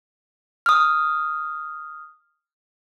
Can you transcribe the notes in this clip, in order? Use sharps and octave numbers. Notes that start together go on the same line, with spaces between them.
D#6 F6